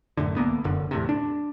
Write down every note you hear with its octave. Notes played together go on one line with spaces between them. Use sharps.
C2 F#2 A2 D3
D2 A#3 B3
F1 F#2 D3
E2 A2 C3
D4